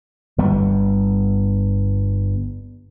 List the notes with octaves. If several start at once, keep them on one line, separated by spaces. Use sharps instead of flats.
G1 G3 B3